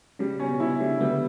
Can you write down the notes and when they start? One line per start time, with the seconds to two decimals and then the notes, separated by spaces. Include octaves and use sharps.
0.19 C#3 G3
0.39 B2 C#4
0.60 C#3 E4
0.80 D3 G3
1.00 G3 B3